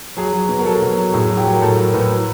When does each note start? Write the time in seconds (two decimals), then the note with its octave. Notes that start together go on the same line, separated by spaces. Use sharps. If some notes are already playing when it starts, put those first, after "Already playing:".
0.17 F#3 G#4
0.33 F#3
0.49 B2
0.59 A#4
0.66 F#3 A4
0.82 B2
0.97 F#3
1.14 A2 G#4
1.30 F#3
1.38 G4
1.45 F#3
1.52 A#4
1.61 A2 A4
1.77 F#3 A#4
1.94 A2 B4
2.10 F#3